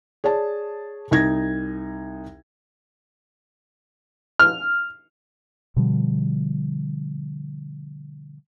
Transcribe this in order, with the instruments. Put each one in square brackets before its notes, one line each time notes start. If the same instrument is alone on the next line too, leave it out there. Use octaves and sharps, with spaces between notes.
[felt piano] G#4 C#5 D5 A5
C2 D#4 G#6 A#6
[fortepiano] F6
[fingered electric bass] B2 D3 F3 G3